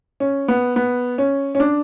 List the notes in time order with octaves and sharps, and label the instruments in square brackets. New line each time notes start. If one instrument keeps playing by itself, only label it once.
[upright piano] C#4
B3
B3
C#4
C#4
D4